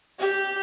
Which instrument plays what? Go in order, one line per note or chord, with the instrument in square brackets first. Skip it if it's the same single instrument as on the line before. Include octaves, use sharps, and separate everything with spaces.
[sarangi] G4